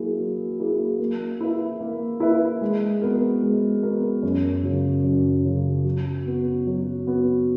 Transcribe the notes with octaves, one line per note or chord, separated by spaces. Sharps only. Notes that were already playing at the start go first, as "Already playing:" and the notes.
Already playing: F#3 A#3 E4 G#4
F#3
A#3 E4 G#4
A#3
E4 B4 E5
A#3
E4 B4 E5
G#3
B3 F#4 A#4
G#3
B3 F#4 A#4
F#2
C#3 F#3
F#2
C#3 F#3
F#3
B3 F#4
F#3
B3 F#4